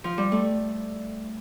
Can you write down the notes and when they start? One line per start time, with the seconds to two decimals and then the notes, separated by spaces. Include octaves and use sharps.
0.04 F3
0.18 G3
0.32 A3